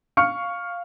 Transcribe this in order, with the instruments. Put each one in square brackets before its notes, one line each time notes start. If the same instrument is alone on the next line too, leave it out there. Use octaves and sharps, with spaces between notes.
[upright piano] F5 C#6 F6 C#7